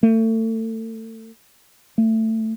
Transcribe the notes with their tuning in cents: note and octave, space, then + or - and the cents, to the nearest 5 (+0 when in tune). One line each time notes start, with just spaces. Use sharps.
A3 +30
A3 +15